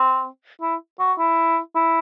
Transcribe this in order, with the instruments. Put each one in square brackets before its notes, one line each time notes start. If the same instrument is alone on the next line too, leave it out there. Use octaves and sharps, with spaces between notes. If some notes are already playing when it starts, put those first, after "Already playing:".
Already playing: [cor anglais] C4
E4
F#4
E4
E4